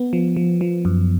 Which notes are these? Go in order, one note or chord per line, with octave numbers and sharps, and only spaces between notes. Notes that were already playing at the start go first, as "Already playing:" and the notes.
Already playing: B3
F3
F3
F3
F#2